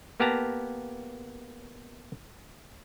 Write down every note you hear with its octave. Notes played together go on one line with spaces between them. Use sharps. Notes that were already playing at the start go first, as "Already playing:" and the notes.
A#3 B3 G4 F5 A5 A#5